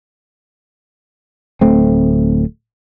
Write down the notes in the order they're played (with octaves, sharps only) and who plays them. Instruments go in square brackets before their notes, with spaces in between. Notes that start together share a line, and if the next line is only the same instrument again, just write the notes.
[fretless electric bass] D1 A3 C4